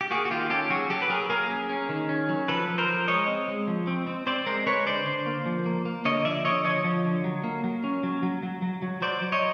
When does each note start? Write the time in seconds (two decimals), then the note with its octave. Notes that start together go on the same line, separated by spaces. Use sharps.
0.01 G4
0.10 A#3 F#4 G#4
0.25 F#4
0.30 D#3 F4 G4
0.50 C#4 G4 A4
0.70 F#3 F#4 G#4
0.90 F#3 G4 A4
1.02 B4
1.09 F#3 G#4 A#4
1.29 A#3 G#4 A#4
1.49 C#4
1.69 C#4
1.89 D#3
2.09 C#4
2.29 F#3
2.48 F3 A4 B4
2.68 F3
2.78 A#4 C5
2.88 F3
3.08 G#3 C#5 D#5
3.28 C4
3.48 G#3
3.67 F3
3.87 C4
4.07 C4
4.27 C4 C5 D5
4.46 G#3 A#4 C5
4.66 G#3 B4 C#5
4.86 D3 C5 D5
5.06 D3
5.26 A#3
5.46 F3
5.66 A#3
5.85 A#3
6.05 D3 C#5 D#5
6.25 F3 D5 E5
6.44 D3 C#5 D#5
6.64 F3 C#5 D#5
6.84 F3
7.04 D3
7.24 F#3
7.44 A#3
7.64 F#3
7.84 C#4
8.03 F#3
8.23 F#3
8.43 F#3
8.62 F#3
8.82 F#3
9.02 F#3 C5 D5
9.22 F#3
9.32 C#5 D#5